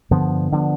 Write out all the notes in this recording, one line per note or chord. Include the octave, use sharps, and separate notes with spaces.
G2 D3 F3 B3
D3 F3 B3